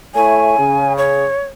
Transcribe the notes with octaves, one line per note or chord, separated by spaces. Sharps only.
A3 E4 C#5 G#5
C#3
C#5